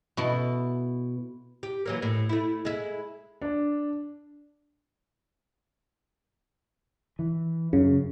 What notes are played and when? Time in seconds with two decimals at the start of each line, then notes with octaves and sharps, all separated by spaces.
0.17 B2 E4 A4
1.63 G4
1.86 E3 F#3 A#3
2.02 A2
2.29 A3 E4
2.65 G#3 E4
3.42 D4
7.19 E3
7.73 F#2 C#3